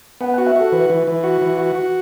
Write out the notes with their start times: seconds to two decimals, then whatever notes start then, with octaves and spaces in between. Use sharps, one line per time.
0.21 B3 F#5
0.34 F#4 F#5
0.46 E5
0.56 F#4 A4
0.72 E3 B4
0.90 E3
1.07 E3
1.24 F#4
1.41 E3
1.58 F#4
1.75 F#4